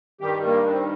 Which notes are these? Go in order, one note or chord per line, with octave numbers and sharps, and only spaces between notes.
G2 D#3 G3 G4
A#3
D4
C4